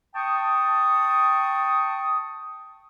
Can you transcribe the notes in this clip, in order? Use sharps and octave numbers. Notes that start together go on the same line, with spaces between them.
G5 A5 C#6 D#6